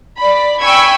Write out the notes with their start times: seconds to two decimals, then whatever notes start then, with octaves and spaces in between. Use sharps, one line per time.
0.18 D5 B5
0.61 G5 G#5 B5 C#6 E6 G#6